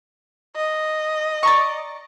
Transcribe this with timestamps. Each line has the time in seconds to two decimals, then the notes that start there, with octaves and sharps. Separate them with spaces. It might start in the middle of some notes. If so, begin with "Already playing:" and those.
0.56 D#5
1.43 D5 A#5 C#6